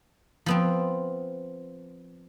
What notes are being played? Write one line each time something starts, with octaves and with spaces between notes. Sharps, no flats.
F3 B3 C4